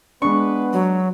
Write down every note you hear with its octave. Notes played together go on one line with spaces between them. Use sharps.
G#3 B3 D4 B4 C#6
F#3